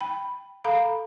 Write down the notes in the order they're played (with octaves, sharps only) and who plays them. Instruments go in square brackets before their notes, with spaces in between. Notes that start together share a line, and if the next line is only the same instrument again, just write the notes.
[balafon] G5 B5
A4 F5 A#5 B5